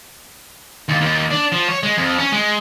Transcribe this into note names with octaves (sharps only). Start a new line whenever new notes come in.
D#2
D#2
D4
F3
C#5
G#3
F2
C#4
G#3